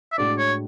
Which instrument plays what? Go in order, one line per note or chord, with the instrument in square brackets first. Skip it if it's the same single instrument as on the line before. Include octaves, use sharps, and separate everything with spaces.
[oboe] E5
[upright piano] A2 G#3 D4 F#4 [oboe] D5
[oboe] C#5